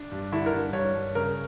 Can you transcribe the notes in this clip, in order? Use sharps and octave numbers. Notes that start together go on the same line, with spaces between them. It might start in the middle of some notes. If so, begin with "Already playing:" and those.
Already playing: D4
G2
D3 E4
A#4
G2
G2 C#5
G2
C#3 A#4